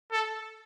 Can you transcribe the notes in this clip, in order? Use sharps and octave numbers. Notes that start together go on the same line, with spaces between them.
A4